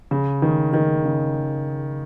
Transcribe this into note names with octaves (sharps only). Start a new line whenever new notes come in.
C#3
D#3
D#3
C#3